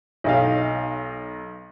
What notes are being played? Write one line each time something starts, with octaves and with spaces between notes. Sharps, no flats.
B1 D#4 F5